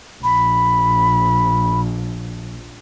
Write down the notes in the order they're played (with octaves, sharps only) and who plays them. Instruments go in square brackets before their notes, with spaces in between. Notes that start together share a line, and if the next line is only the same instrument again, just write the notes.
[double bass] A#1 [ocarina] B5